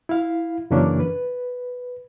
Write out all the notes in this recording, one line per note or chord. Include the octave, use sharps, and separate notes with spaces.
E4 F5
F#2 C#3 E3 A#3 C#4 D4
B4